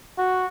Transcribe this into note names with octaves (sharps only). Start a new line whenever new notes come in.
F#4